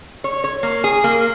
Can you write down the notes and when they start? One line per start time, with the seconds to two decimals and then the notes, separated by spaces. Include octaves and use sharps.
0.24 C#5
0.44 C#5
0.63 A#3
0.84 G#4
1.04 A#3